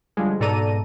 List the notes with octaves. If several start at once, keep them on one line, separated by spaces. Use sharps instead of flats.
D3 F3 G3 G#3
G#2 B2 A4 D5 A#5 D#7